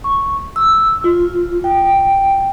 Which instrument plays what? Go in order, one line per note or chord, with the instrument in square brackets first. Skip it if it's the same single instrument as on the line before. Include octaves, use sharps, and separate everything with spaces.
[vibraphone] C#6
E6
F4
G5